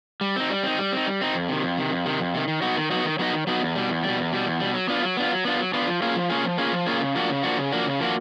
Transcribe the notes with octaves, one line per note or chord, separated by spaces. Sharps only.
G3
C4 D#4
G3
C4 D#4
G3
C4 D#4
G3
C4 D#4
F2
C3 D#3
F2
C3 D#3
F2
C3 D#3
F2
C3 D#3
D#3
F#3 B3 D#4 F#4
D#3
F#3 B3 D#4 F#4
D#3
F#3 B3 D#4 F#4
D#3
F#3 B3 D#4 F#4
E2
B2 G3
E2
G3
B2
E2
B2 G3
E2
B2 G3
F#3
B3 D4 F4
F#3
B3 D4 F4
F#3
B3 D4 F4
F#3
B3 D4 F4
F3
A#3 C#4 F4 G#4
F3
A#3 C#4 F4 G#4
F3
A#3 C#4 F4 G#4
F3
A#3 C#4 F4 G#4
C#3
F3 A#3 D4 F#4
C#3
F3 A#3 D4 F#4
C#3
F3 A#3 D4 F#4
C#3
F3 A#3 D4 F#4